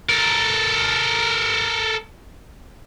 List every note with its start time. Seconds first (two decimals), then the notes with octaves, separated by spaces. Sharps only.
0.09 A4 A#4